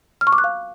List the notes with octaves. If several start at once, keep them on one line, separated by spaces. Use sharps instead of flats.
F6
C#6
D6
F#6
F5